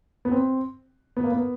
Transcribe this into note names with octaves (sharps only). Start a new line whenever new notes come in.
B3
C4
B3
A#3
B3